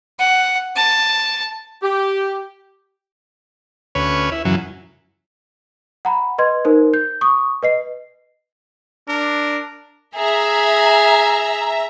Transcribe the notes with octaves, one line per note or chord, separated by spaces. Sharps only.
F#5
A5
G4
D2 C#4 B4 C#5
E4
F#2 C#3 E3 F#3
F#5 A#5 B5
B4 D#5 C6 G#6
D#4 A#4 C5
G6
C#6 D#6
B4 D#5 C7
D4 A#4
G#4 E5 A#5